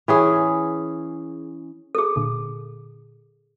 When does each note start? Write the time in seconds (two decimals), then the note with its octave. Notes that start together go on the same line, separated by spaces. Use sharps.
0.08 E3 C#4 G#4
1.95 G#4 A4
2.16 A#2 D3